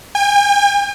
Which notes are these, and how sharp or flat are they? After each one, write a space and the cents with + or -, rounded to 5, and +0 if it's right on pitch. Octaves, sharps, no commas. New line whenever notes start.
G#5 -45